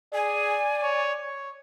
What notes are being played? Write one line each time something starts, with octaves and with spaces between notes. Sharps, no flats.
G#4 D5 G#5
C#5
C#5